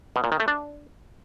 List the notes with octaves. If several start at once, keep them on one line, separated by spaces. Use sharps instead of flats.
B2
A#2
D#3
A3
D4